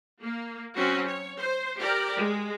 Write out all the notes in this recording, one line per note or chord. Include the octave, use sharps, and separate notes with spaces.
A#3
F#3 C4 C#4 F#4
C#5
C5
G4 A#4 D5
G#3